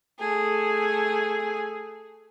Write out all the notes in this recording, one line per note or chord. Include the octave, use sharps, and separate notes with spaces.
A3 G#4